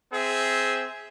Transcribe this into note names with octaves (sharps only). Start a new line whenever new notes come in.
C4 G#4 E5